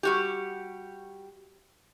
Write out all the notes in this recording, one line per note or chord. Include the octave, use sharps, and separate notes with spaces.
G3 F#4 G4